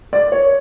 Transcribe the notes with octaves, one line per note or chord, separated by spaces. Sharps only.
D5
C#5